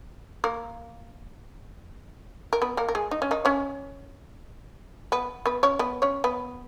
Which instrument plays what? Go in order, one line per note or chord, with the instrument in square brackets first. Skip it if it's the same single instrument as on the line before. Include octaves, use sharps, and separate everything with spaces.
[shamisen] A#3 A#4
A#4
B3 B4
A#3 A#4
A#4
G#3 G#4
D#4
C#4
D#3 D#4
C#4 C#5
B3 B4
B3 B4
C#4 C#5
B3 B4
C#4 C#5
B3 B4